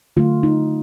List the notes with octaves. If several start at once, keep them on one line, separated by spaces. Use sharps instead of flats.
D3 F#3 A3 F4
D#4